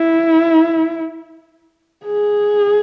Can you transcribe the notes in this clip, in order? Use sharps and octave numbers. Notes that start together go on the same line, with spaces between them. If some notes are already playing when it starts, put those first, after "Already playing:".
Already playing: E4
G#4